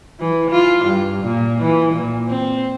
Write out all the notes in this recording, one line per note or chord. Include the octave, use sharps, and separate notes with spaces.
E3
F4
G2
A#2
E3
A#2
C4